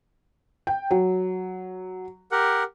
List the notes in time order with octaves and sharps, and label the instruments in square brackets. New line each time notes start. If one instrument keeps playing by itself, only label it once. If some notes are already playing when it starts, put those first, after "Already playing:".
[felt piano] G5
F#3
[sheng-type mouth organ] G4 A#4 F#5